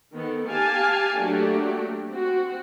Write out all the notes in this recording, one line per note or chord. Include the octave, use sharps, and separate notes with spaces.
D#3 B3 A4
G4 F5 G#5 A5
F#3 A3 A#3 D4 F#4 G4
C4 F#4